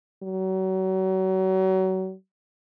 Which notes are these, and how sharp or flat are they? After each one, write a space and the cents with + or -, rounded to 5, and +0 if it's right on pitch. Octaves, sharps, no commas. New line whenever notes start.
F#3 +35